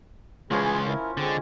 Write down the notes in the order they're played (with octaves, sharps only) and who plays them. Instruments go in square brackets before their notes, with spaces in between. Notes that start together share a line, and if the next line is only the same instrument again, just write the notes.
[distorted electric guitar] C#2 G#3 [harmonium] E3 G#4 B4 [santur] F3 C#4 G#5
[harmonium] E4 A#4
[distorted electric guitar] D3 [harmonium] G#3 C4